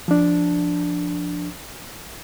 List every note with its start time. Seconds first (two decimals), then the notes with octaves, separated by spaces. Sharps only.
0.08 F3 D4